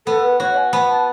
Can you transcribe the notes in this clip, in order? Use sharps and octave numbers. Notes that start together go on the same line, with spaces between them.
B3 A4
B4
F#4 C#5
G#5
B3 B5
A5